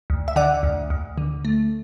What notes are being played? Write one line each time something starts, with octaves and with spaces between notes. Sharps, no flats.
D2
E5
D3 D5 F#5
D2
D2
D3
A3